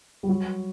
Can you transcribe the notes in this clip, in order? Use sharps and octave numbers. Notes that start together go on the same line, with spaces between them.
G3
F#3